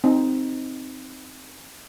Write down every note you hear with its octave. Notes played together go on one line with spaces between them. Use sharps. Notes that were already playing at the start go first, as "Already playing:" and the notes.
C4 D#4